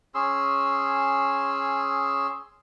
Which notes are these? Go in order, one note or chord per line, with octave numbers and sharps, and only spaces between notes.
C#4 G#4 C6 E6